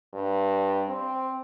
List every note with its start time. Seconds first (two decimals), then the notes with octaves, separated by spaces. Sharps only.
0.13 G2
0.88 C4